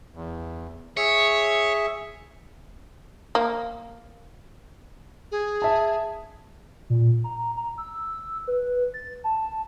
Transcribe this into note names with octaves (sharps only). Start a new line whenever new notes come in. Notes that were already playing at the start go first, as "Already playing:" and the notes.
E2
G#4 C#5 E5
A#3
G#4
E5 A5
A#2
A#5
A#5
E6
B4
A6
A5